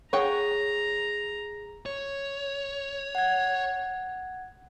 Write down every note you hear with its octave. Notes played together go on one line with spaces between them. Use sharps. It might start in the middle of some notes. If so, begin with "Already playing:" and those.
G#4 C#5 F#5 G5 A#5
C#5
F#5 G#6